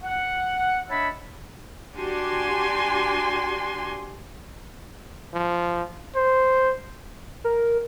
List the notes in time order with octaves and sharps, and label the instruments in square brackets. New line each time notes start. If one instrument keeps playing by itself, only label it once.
[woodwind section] F#5
D4 C#5 D#5 E5 A5 B5
[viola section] D4 F#4 G4 G#5 C6
[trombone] F3
[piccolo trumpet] C5
[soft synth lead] A#4